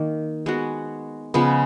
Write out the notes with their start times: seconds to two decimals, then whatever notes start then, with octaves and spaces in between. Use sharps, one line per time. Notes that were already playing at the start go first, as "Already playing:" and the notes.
Already playing: D#3 A#3
0.46 G#3 B3 F#4
1.34 C#3 F3 G#3 B3